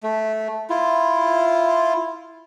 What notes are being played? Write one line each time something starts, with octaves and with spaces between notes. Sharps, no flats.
A3
E4 F4